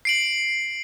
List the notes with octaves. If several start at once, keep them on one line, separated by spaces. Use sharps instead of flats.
C7 D7 F#7